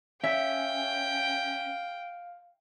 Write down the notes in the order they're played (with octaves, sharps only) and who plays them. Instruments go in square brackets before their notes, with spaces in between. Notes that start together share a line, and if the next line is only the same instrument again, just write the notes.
[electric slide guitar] C#4 [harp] E5 [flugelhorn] F5 [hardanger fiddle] G5